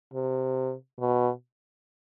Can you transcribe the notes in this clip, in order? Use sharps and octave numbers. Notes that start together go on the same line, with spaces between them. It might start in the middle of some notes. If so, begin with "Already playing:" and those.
C3
B2